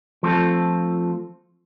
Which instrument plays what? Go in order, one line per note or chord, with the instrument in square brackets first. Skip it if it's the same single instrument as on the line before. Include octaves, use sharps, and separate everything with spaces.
[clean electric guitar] F3 A3 C4 F4 A4